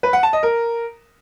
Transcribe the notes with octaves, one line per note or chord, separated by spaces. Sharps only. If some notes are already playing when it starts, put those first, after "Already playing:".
B4
F#5
A5
D#5
A#4